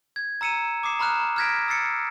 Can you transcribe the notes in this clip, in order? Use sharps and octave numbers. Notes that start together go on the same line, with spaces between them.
G#6
A#5 E6 C#7 D#7 E7
D6 D#6 C7 E7
A#5 B5 F6 F#6 E7
F6 F#6 G#6 A#6 B6 D7
E6 A6 C7 C#7